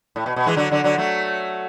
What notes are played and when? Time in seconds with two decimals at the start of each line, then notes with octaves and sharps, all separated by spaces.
0.16 A2
0.26 B2
0.36 B2
0.46 E3 G#3
0.57 D3 F#3
0.71 D3 F#3
0.84 D3 F#3
0.98 F#3 A3